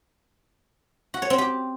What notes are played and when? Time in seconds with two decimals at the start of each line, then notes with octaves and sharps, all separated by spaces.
1.14 F#4
1.22 C#5
1.30 C4
1.38 G4